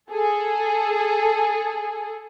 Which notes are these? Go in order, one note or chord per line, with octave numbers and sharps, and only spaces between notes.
G#4 A4